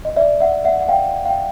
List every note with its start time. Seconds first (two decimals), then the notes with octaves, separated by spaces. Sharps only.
0.05 D#5
0.16 D5 E5
0.41 E5 F#5
0.65 E5 F#5
0.80 F#5
0.89 F5 G5
1.25 F5 G5